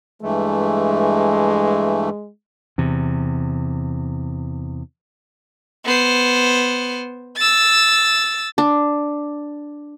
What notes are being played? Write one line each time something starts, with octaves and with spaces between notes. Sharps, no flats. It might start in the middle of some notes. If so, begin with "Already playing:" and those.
G2 E3 G#3 A3
E2 C3
B3 C5
E6 A6
D4